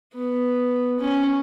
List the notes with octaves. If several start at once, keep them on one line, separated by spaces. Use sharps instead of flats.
B3
C#4